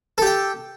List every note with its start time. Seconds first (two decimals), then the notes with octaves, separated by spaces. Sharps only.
0.18 A4
0.22 G4
0.26 G5